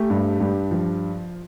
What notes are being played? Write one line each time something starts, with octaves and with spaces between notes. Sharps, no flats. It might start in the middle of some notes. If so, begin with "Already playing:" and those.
Already playing: A3 G4
G2
G2
F3